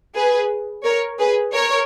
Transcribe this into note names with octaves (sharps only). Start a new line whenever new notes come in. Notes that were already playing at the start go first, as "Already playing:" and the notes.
G#4 B4
A#4 C#5
G#4 B4
A#4 C#5